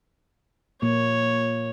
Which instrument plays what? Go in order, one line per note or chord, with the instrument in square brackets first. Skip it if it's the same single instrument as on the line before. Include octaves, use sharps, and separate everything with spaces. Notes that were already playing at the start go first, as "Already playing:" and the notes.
[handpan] A#2 A#3 [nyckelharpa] C#5